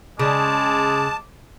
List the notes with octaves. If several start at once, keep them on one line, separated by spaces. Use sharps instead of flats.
C#3 G#3 A5 D6